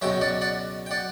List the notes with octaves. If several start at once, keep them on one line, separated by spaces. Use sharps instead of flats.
C#2 B2 F#3 E5 G5
D5 F#5
D5 F#5
G5
D5 F#5